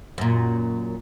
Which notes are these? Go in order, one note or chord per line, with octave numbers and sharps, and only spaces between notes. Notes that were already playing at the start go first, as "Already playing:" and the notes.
F#2 A#2